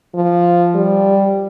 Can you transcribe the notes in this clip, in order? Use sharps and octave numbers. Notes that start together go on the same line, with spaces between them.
F3
G3